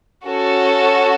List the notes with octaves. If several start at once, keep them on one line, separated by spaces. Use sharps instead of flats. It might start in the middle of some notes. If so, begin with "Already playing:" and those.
C#4 F#4 A4